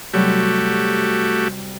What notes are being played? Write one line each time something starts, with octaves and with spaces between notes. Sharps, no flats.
C3 F#3 G3 A3 F#4 G4